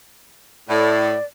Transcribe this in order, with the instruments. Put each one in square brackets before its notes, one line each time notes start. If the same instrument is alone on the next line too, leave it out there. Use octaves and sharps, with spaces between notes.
[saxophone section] A2 [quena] D5